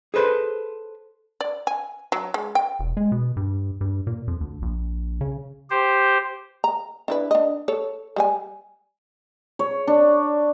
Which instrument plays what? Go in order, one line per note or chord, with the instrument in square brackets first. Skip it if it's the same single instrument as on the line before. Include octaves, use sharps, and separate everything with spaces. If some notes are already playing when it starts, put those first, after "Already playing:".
[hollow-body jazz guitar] G#4 A4 B4 C5
[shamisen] D5
G#5
F#3
G#3
G5
[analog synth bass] E1
G#3
B2
G2
G2
A#2
F2
D2
A#1
C#3
[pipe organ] G4 C5
[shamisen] A#5
D4 E4 B4
D4 D#5
A4 C#5
G3 G#4 G#5
[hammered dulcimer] C#5
D4